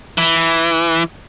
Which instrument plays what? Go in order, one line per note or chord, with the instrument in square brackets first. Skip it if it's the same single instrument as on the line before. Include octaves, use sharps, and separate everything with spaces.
[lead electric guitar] E3